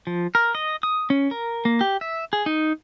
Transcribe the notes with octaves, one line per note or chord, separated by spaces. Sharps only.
F3
A#4
D#5
D#6
C#4
A#4
A#3
G4
E5
G#4
D#4